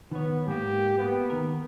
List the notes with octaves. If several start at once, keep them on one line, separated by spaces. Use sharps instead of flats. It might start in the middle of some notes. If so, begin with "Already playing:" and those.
D#3 B3 C#5
G#2 A#3 G4
A#3 B3
D#3 A#4